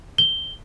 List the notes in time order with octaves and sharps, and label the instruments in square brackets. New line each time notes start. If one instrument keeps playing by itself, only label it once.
[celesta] G7